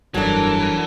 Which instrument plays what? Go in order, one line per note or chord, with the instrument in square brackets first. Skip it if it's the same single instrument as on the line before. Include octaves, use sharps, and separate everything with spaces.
[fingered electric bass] F1 G2 [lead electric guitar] E3 [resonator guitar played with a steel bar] F#3 D4 [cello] A4 A#4